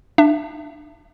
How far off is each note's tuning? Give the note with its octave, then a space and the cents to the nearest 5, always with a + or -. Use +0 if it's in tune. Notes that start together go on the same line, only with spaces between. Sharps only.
D4 +20 E5 +20